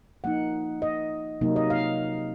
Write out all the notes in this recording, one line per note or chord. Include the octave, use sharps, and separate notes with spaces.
F3 A#3 D#4 F#5
D#5
C3 F#3 A#3 D#4
D#5
F5